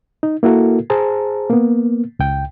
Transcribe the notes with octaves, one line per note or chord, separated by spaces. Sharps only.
D#4
A#3 E4 F#4 A4 A#4
G#4 C5 A5 A#5
A#3 B3
C#2 G5